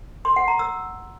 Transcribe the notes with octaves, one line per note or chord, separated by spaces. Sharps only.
C6
F#5
A#5
E6